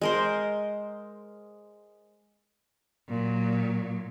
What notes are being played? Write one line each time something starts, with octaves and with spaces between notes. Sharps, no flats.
G#3 A#4 C5
A#2 F#3